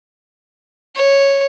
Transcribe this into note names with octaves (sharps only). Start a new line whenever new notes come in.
C#5